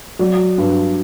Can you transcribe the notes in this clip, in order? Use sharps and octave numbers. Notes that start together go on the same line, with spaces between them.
F#3 D5
G2